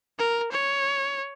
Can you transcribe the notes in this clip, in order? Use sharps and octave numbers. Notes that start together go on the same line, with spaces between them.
A#4
C#5